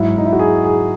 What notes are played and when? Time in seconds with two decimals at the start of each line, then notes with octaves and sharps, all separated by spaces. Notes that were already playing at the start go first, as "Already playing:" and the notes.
Already playing: G#2 F#3 E4
0.18 D#4
0.25 E4
0.33 F#4
0.39 G#4
0.64 G#4